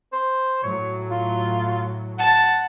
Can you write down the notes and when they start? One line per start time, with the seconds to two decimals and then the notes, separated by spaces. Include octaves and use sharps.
0.13 C5
0.63 A2 F#3 C#5
1.11 F4
2.19 F#5 A5